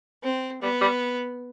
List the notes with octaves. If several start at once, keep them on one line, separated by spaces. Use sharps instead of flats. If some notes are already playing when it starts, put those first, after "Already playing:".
C4
G3 B3
G3